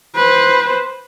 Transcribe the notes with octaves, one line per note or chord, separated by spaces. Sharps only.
B4 C5